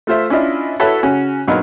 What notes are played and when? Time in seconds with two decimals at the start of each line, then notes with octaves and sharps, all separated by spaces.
0.07 A3 F4 C5 E5
0.30 C#4 D4 E4 F4 D#5
0.79 E4 F#4 A4 B4 C#5 E5
1.03 C#3 C#4 F#4
1.48 A#1 F#3 B3 D#4 F6